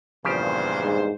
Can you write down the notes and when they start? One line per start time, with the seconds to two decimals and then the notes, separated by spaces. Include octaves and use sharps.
0.25 E2 G2 A#2 C#3 F3 G4 C5
0.80 G#2